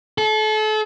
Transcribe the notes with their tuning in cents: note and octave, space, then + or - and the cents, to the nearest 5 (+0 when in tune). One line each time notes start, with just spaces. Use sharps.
A4 -35